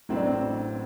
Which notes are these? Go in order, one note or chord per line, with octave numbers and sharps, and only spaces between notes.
A1 A2 F#3 C4
D4
C4